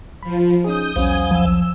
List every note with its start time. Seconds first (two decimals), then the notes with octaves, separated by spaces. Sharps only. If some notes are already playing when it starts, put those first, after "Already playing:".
0.23 F3 B5
0.64 C#4 D#4 G#4 D#6 G6
0.96 B1 E2 F#3 C#4 C5 F5 G#5 D#6
1.31 F3 E6